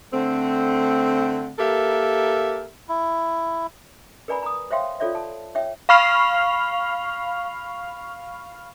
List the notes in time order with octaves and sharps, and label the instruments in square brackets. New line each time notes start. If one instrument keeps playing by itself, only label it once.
[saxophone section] D3 A3 C4
A#3 G4 A4 A#4 E5
[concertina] E4
[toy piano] A#4 B4 D5 G#5 A#5 B5
A#5 D#6
C5 C#5 E5 F5 G5 C6
F4 A4 C#5 D5 E5
A5
C#5 E5 G5
[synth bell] F5 B5 C#6 F6 C7 F7